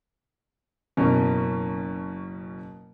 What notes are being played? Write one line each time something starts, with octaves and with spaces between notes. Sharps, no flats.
F#1 B2 C#4